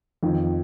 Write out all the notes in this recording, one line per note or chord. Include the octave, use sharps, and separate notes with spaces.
F2 D#3